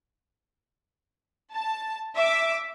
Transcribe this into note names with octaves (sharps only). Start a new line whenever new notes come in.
A5
E5 D6